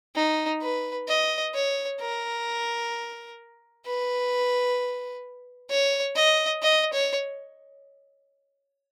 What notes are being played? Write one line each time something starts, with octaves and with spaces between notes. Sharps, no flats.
D#4
B4
D#5
C#5
A#4
B4
C#5
D#5
D#5
C#5